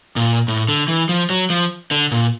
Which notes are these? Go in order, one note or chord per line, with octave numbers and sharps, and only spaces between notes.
A#2
A2
D3
E3
F3
F#3
F3
D3
A#2